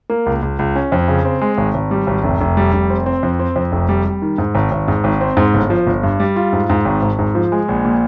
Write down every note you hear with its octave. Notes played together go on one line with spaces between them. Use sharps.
A#3
C#2
C#2
C#2
C#4
F2
C#3
C4
G#3
G#1
G#1
G3
G#1
F1
F1
G3
F1
C4
C4
F2
C4
F2
F1
G3
G3
D#3
G#2
G#1
G#1
G#2
G#1
C4
G#2
G1
F3
G1
G2
G3
F4
G#2
G#2
G#1
G#1
G#2
F3
G#3
A#1
A#2